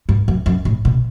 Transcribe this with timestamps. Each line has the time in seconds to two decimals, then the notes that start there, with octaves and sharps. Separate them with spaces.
0.09 G2
0.28 F#2
0.46 F#2
0.65 A2
0.85 B2